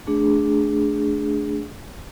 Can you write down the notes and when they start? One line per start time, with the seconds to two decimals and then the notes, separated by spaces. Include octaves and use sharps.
0.07 A3 D4 G#4